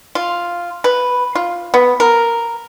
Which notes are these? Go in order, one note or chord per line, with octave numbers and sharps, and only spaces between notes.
F4
B4
F4
B3
A#4